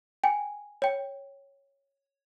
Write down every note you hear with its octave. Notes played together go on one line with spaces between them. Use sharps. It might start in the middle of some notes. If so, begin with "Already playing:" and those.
G5 G#5
C#5 G5